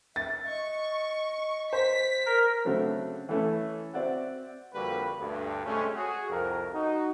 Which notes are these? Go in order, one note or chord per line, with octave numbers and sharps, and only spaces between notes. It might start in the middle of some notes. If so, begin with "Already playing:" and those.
E5 A6
D#5 C#6
C5 B6
A#4
C#3 F#3 A3 C4 D4
E3 A3 C#4
C4 F#4 D5 E5 F#5
F2 D3 G3 A#3 F#4 B4
D2 G2
C3 G#3 A3 C#4
F#4 G#4
C2 F2 A#4
D#4 F#4